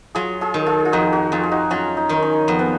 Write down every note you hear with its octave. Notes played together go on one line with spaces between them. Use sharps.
F#3 F4 G#4
F4 G#4
D#3
F4 G#4
F4
F2 D#4 F#4
F#4 A#4
F2 F4 G#4
G#4
D#4 F#4
F#3 C#4 F4
D#4
D#3 D#4
C#4
F2 B3
B3